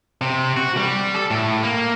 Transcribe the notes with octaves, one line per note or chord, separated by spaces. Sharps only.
C3
F#4
G3
A4
A2
A#3